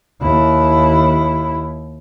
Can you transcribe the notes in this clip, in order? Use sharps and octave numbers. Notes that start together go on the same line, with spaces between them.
D#2 E4